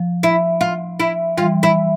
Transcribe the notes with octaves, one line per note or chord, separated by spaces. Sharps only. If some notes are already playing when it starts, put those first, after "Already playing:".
Already playing: F3
E4
F4
E4
E3 G3 F4
E4